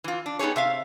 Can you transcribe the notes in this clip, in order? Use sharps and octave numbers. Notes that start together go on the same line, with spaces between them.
E3 F4
D4
B3 D#4 G4 G#4 C#5
C3 E5 F5